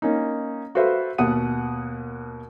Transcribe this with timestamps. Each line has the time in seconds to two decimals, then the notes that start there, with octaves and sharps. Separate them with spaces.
0.02 A#3 C#4 D#4
0.75 F#4 A4 B4 C5 E5 F5
1.18 D#2 B2 F#5 D#6 D#7